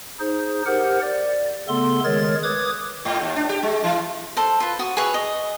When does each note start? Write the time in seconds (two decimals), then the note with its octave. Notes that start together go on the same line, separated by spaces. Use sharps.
0.20 D#4 G#4 C5
0.66 G4 A#4 C5 F#5
1.02 D5
1.68 C#3 A3 B3 A4 C6
2.04 D#3 G#3 G#4 A#4 C#5 A6
2.43 B4 D6 D#6 G#6
3.05 G#2
3.21 D#2
3.36 D4
3.49 G4
3.63 G#3
3.84 E3
4.37 A4 C5
4.60 F4 B4
4.79 F#4 D#6
4.97 G#4 B4 C#5 E5
5.14 D#5